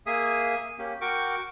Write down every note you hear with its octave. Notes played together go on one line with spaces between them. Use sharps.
A#3 G#4 E5 D#6
A#3 C#4 G4
F#4 A#4 G5 C#6 D6